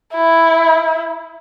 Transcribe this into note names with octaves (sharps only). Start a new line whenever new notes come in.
E4